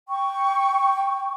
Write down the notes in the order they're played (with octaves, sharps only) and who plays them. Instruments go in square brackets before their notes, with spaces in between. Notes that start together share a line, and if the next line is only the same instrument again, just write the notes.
[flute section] G5 C#6